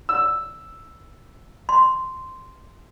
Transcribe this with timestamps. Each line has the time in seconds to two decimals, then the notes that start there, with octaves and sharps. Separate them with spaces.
0.09 E6
1.69 C6